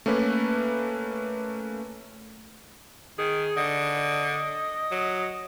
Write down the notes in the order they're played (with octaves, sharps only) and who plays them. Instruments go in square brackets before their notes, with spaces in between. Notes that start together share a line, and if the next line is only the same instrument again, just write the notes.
[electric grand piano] A3 A#3 C#4 B4
[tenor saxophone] D#3 [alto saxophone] G#4
[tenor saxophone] D3 [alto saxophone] D#5
[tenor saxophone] F#3